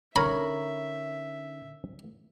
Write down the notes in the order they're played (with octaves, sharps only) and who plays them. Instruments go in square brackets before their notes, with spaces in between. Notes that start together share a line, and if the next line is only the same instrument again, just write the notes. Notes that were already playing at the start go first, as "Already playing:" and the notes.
[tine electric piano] D3 C#4 D#4 [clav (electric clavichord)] A#4 C#5 A#5 [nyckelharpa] E5 [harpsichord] B5